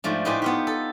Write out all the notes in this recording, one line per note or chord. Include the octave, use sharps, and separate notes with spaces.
G#2 F3 A3 D4
A2 D#4 G4 B4 C5 G#5
B3 F4 G4
A4